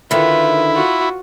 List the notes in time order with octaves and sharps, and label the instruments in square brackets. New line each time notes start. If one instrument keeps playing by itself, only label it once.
[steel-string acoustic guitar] D3 D#3 [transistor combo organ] E4 [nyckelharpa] F4 B4 [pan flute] E5
[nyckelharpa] F4 F#4